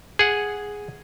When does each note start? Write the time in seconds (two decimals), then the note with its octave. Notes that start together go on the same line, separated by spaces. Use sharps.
0.19 G#4 F#5